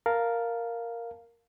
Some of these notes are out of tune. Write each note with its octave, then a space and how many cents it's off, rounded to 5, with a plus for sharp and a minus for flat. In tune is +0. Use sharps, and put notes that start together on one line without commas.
A#4 +0 F5 +0 A5 +0